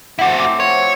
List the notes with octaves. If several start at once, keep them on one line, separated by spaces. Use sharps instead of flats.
A3 C4 E4 F#4 G4 F#5
C4 E5 D6
F#3
F3 C#5
F#3